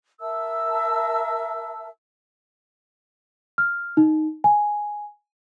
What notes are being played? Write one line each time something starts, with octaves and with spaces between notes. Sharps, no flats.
A#4 E5 A5 E6
F6
D#4
G#5